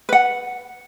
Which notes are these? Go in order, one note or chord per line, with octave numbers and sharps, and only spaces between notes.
B4 F#5